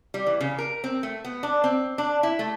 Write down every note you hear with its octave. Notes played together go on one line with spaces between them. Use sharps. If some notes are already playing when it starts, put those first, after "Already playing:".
G3
E3
C#3
A#4
C4
A3
B3
D4
C4
D4
E4
A3